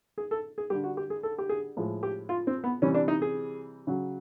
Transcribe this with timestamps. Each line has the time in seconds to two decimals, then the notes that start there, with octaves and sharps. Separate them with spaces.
0.18 G#4
0.31 A4
0.58 G#4
0.70 D3 G3 G4
0.84 F#4
0.97 G4
1.10 G#4
1.23 A4
1.38 G4
1.49 G#4
1.77 A2 F3 G#3
2.03 G4
2.29 F4
2.47 C4
2.64 B3
2.82 C3 E3 G3 C#4
2.94 D4
3.08 D#4
3.22 G#4
3.87 C#3 F#3